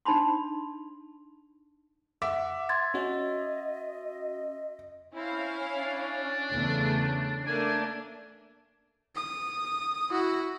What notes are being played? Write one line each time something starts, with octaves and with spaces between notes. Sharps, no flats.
D4 D#4 A5 B5 C6
E5 F#5 D6
C6 G#6 A6
C#4 F#4 D#5
C4 C#4 E4 F5
D4
E2 C#3 A3
A3 A#3 D4 G#5
D#6
E4 F#4